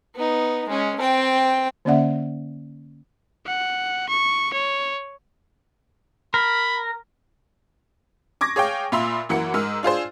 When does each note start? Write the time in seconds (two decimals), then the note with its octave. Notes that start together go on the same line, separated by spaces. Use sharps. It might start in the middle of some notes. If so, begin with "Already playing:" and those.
0.15 B3 D#4
0.69 G#3 C#4
1.00 C4 G5
1.85 D3 A#3 C#4 D5 E5 F#5
3.46 F#5
4.09 C#6
4.53 C#5
6.34 A#4 B5
8.41 C#6 D6 G#6 A#6
8.56 G#4 C#5 F5 G5
8.92 A#2 F4 E5 B5 C6 F7
9.29 F#2 E3 A#3 F#5 C#7
9.54 G#2 A#4 E6 F6
9.83 D4 F4 G#4 C5